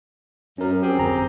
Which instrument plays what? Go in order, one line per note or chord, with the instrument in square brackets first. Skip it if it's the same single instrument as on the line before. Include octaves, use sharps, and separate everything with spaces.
[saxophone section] F#2 [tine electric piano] C#4 A#4
[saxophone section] C4 G4 G#4
[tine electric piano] G1 F2 A#5